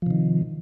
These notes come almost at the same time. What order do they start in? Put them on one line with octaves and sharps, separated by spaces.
F3 C3 D#3